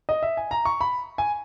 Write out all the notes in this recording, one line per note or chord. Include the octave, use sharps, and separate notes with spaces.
D#5
E5
G#5
A#5
C#6
B5
G#5